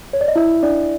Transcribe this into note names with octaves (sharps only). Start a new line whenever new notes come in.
C#5
D5
D#5
E4 E5
D4 D5